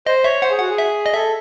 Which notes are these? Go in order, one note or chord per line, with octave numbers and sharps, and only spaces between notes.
C5 D#5
C#5 E5
C5 F#5
G#4
F#4 F#5
G#4
E5
D#5
A4 E5